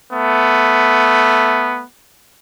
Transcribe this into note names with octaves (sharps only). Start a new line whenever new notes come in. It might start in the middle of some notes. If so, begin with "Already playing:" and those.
A3 B3